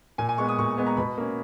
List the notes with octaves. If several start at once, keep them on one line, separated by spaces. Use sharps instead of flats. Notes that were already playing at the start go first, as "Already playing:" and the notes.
A#2 G#5
G#5
G#3 B3 C#6
D#6
A#2 C#6
G#3 B3
A#5
B2 B5
A#3 C#4